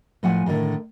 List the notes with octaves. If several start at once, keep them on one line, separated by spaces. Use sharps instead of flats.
A2 F3 F#5 G#5
A2 D3 D#3 F#3